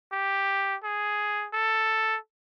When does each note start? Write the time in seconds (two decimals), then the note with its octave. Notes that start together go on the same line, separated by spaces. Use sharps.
0.12 G4
0.84 G#4
1.53 A4